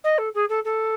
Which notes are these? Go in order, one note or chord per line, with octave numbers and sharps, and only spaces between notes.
D#5
A4
G#4
A4
A4